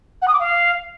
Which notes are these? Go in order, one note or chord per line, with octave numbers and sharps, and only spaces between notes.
F#5
D#6
D6
F5